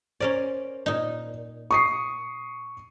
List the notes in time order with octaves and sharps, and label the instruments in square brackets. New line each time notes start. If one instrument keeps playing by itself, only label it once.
[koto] C#4 A#4 D5 [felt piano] C5
[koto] A#2 D#4
[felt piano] C#6 D#6 C7